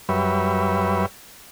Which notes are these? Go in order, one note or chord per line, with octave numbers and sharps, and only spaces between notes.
F#2 G3 B4 C#5 E5